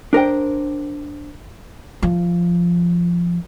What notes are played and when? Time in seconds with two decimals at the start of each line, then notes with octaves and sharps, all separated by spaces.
0.13 D4 A#4 C5 G5
2.02 F3